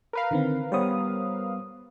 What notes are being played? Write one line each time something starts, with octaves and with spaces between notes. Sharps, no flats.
A#4 B4 F5
D3 D#3 C4
G3 B3 C5 C#5 D#6